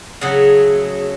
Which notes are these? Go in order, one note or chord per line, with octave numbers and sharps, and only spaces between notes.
C#3 F#3 A3 G#4